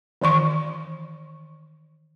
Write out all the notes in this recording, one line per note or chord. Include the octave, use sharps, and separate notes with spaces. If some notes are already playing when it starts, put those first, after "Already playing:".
D#3 E3 C6 C#6